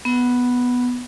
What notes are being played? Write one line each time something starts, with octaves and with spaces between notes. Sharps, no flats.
B3